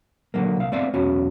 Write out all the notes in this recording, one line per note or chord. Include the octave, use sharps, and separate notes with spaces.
A#2 D3 F#3 A#3
C2 F5
A3 B3 C4 D5 E5 F5
B1 E2 B3 C#4 F#4